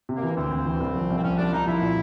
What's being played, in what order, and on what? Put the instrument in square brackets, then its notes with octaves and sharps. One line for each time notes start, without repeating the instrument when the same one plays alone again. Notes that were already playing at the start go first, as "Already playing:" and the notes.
[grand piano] C3
[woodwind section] A#3
[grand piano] E3
[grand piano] D2 [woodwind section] C4
[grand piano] D2
E3
C2
F3
C2
[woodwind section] C4
[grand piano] F3 [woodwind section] C#4
[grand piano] C2 [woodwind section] D4
[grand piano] F3 [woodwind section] D#4
[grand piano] C2 [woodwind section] E4
[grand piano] A#2